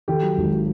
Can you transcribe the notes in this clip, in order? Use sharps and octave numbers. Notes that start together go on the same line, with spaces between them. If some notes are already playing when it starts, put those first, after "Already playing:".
D#3 G4 A4
F#3
G#1